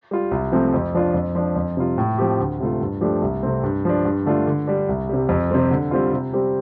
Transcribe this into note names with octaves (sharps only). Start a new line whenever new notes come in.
G3 F4
C2
C3 F3 A3 C4
F2
F3 D4 F4
F2
F3 D4 F4
F2
C3 G3 F4
A2
F3 C4 G4
D2
C3 A3 F4
G2
F3 A3 D4 G4
C2
C3 A3 C4
G2
F3 D4
G2
D3 A3 D4 F4
D3
G3 D4
C2
C3 G3
F2
C3 G3 C4
D3
G3 C4 F4
C3
G3 C4 G4